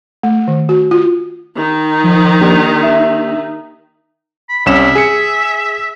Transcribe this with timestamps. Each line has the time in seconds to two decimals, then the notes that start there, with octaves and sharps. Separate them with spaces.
0.23 A3
0.48 D#3
0.69 F#4
0.91 F4
1.56 D#3 D#4
2.03 F3
2.41 A#3 D4 G4
2.83 E5
4.49 B5
4.66 C2 C#4 E5 E7
4.95 G#4 B6 C#7